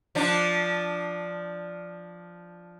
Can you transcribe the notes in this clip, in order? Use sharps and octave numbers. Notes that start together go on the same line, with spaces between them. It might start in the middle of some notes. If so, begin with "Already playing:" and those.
F3 D4